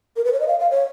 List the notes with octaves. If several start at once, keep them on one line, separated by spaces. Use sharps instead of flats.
A#4
B4
C#5
D#5
F5
F5
C#5